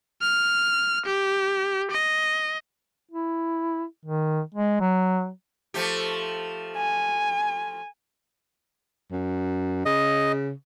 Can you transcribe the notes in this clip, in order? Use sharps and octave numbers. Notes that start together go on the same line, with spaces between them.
F6
G4
D#5
E4
D#3
G#3
F#3
F3 A3 G4
G#5
F#2
C#3 D#5